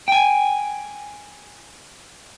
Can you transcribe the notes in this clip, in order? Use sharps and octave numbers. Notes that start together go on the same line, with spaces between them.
G5 G#5